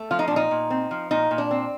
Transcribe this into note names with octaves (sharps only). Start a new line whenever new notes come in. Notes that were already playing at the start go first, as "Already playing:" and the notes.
Already playing: A3
F3 F4
D#4
A#2 D4
D#4
A#2
C4
F3
A#2 D#4
A#2
D4
C4